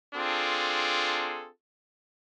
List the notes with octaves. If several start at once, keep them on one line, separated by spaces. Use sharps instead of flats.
C4 D4 F4 G#4 A4